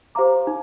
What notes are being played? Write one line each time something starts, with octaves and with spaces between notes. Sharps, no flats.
G4 C5 F5 A#5 D6
D#4